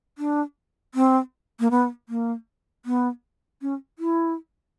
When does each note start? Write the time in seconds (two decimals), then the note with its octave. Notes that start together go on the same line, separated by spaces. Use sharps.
0.18 D4
0.95 C4
1.60 A#3
1.71 B3
2.09 A#3
2.85 B3
3.62 C#4
3.99 E4